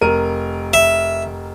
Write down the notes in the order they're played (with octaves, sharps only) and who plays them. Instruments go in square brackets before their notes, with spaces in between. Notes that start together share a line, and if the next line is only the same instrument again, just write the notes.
[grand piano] F1 A#4 D#7
[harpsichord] E5